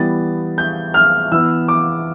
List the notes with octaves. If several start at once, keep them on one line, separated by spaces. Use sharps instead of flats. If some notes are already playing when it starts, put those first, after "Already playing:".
Already playing: E3 G3 B3 A6
G6
F6
E3 B3 E6
D6